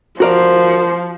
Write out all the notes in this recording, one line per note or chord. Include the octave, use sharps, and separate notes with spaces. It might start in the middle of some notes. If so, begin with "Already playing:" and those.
F3 F#4 A#4 C5 D5